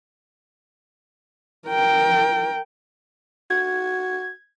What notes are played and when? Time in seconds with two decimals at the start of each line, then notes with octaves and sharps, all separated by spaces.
1.68 A#4 G5
3.50 F#4 G#6